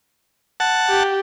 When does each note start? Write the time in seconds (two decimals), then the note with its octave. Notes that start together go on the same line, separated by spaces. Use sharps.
0.60 F#5 A5
0.88 G4